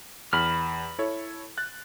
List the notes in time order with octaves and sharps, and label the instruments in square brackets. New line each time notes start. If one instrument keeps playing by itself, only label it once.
[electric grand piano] E2 [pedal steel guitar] B5 F6
[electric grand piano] E4 A4 C#5
F#6 A6